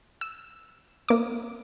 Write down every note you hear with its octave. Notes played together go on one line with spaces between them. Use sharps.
E6
A#3 D6